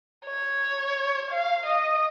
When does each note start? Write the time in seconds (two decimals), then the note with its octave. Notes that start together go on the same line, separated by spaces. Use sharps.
0.26 C#5
1.30 F5
1.65 D#5